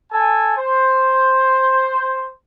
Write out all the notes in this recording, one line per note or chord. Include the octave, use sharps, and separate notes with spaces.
A4 G#5
C5